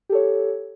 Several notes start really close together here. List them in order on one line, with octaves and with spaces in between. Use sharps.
G4 A4 C#5